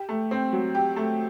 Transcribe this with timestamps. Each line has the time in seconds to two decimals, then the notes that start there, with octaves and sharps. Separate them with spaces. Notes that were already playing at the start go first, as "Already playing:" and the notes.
Already playing: G4
0.09 A3
0.31 C4
0.53 F#3
0.75 G4
0.96 A3